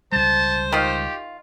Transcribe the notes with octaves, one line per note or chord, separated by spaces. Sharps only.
C#2 G3 C5 A5
D#3 F4 G4